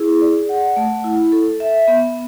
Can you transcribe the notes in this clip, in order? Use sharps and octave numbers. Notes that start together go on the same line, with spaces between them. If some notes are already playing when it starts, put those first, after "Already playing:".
Already playing: E4 G#4
D5
F#5
A3
E4
A4
E5
B3